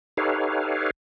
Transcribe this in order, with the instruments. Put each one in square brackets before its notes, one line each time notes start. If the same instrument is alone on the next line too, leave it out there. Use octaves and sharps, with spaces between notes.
[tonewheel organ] D#4 G4 A4 B4 C#5 F5